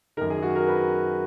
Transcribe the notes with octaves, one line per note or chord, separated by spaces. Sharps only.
F#2 D#3 A#4
G#4
F#4
A#4
B4